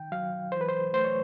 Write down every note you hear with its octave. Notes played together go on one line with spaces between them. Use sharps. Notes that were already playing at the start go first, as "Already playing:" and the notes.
Already playing: D#3 G5
F#3 F5
E3 C5
B4
C5
A3 C5
C#5